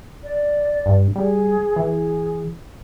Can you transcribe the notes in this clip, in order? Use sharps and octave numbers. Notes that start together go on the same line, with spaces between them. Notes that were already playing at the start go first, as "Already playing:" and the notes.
D5
G2
G3 G#4
E3 G#4